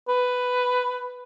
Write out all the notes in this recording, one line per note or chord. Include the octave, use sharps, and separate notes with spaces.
B4